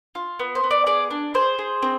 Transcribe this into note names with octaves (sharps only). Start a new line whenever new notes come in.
F4
B3
C5
B3
D5
G#4 D5
D4
G#4 C5
G#4
C4